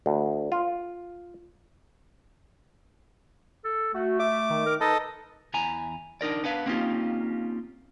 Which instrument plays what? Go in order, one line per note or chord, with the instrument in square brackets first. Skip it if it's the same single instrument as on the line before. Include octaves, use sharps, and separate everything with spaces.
[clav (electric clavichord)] D2
F4
[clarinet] A4
[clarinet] A3 [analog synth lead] F#4
[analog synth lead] E5 [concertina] D6
[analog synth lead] D#3
[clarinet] A#4
[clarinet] D#4 [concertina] A4 D#5 [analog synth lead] B4
[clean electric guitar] E2 E3 G#5 A#5
D4 D#4 A#4 D5
B3 D4 B4 F5
A#3 C4 C#4 D#4 F4 G4